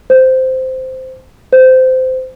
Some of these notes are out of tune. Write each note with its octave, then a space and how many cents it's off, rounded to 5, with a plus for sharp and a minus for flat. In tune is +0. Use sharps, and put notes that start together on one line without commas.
C5 -10
C5 -20